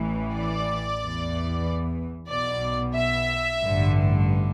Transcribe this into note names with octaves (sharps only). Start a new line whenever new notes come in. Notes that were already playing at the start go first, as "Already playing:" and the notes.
Already playing: A1 A2 E3
D5
E2 E3
B1 B2 D5
E5
A1 G2 D3